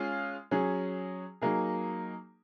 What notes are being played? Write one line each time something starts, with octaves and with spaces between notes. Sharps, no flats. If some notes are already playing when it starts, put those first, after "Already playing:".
Already playing: G#3 C#4 F4 G#4
F#3 C#4 G#4
F#3 A#3 D#4 G#4